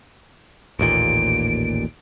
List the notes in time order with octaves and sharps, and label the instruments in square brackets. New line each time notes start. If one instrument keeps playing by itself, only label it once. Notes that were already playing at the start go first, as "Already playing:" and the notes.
[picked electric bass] A1 D#2 A#2 [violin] D7